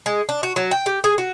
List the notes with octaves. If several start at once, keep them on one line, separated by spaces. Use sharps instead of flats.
G#3
D4
F#4
F#3
G5
G4
G#4
F#4